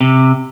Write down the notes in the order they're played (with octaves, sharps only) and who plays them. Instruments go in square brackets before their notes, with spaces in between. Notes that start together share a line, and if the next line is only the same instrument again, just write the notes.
[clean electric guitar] C3